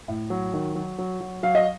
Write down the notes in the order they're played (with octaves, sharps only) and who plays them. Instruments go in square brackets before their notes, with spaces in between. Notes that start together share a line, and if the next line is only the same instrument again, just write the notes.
[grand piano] A2
F#3
D#3
F#3
F#3
F#3
F#3 F5
D#5